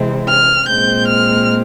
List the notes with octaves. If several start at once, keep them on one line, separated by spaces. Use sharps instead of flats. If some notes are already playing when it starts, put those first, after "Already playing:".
Already playing: C3 E3 G#3 C4
F6
A#2 G#3 C4 G6
F6